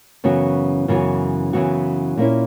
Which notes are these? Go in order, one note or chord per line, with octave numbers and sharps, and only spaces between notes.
F#2 C#3 E3 B3 F#4
F#2 C#3 E3 B3 F#4
F#2 C#3 E3 B3 F#4
A#2 A#3 C#4 E4